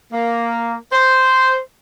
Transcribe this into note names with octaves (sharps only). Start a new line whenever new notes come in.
A#3
C5